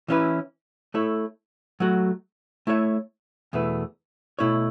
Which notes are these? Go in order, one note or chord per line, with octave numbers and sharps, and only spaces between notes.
E3 C#4 E4 B4
A3 E4 A4 C#5
F#3 A3 F#4
A3 E4 C#5 E5
E2 B2 A3 E4 B4
B2 A3 E4 C#5